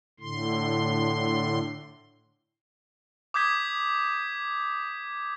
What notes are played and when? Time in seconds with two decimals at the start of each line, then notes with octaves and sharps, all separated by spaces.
0.20 A2 D3 C6
3.34 D6 D#6 G6 G#6 B6